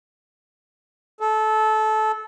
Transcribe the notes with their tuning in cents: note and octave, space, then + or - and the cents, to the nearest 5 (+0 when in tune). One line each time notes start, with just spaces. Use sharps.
A4 -20